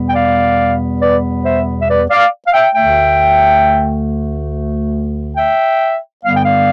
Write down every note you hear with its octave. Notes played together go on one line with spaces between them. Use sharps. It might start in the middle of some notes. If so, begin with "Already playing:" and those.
Already playing: E2 B2 G3 B3
G5
D5 F5
B4 D5
C5 E5
E5
B4 D5
D5 F5
F5
E5 G5
D2 D3 A3 E5 G5
E5 G5
G2 D3 G3 B3 F5
G5
D5 F5